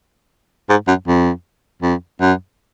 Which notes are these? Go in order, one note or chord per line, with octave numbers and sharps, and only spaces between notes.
G#2
F#2
F2
F2
F#2